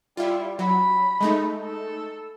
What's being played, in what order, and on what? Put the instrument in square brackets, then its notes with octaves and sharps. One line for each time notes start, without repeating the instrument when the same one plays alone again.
[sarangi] G3 [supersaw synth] E4 F4
[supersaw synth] F#3 [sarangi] B5
[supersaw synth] G#3 A3 D#4
[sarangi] A4